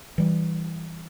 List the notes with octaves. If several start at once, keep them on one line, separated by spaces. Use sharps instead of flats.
E3 G3